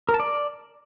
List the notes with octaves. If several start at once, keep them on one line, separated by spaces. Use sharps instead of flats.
A#4
A5
D5